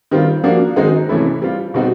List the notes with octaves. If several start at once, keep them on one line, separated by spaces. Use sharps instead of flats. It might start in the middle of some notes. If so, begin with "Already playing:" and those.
D#3 G3 C4 F4
F3 A#3 D4 F#4
D#3 G#3 C4 D#4 F#4
C3 E3 A3 C#4 E4
G3 C4 F4
B2 G3 C4 D#4 F#4